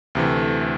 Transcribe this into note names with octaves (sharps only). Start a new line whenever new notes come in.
D2 C3 E3 A3